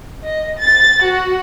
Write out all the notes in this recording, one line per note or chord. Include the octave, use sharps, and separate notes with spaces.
D#5
A6
F#4